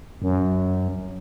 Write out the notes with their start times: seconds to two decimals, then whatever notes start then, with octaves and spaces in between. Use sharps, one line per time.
0.22 F#2